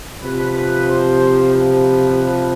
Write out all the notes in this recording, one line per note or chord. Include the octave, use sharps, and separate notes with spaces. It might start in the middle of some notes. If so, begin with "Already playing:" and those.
C3 F3 B4
B4
C5
B4